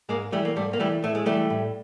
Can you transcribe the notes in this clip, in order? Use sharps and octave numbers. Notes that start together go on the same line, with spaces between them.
G#2 G#3 A#3
E3 G3 A3
A#3
G#2 G3 A3
A#3
E3 G3 A3
A2 A3
G#3
E3 G3 A3
A2